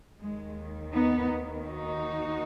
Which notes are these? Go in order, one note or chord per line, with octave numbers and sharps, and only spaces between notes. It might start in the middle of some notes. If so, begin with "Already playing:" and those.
D#2 D#3 G#3
B3 D#4
D#4 F#4